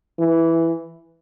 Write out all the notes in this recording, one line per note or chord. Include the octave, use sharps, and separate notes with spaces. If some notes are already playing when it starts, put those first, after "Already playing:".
E3